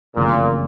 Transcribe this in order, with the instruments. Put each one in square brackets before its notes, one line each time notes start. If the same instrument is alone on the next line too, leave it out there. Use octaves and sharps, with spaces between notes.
[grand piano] F#1 F2 C#3 E3 A3 [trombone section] A#2